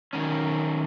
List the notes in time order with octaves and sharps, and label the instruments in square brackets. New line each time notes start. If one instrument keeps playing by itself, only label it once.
[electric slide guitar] D#3 F#3 C#4